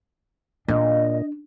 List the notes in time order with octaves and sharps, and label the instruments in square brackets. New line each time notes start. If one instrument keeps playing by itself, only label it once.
[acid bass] A#2 [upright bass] D4 [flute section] D#5